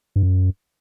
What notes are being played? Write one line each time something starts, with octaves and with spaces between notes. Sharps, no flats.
G2
F#2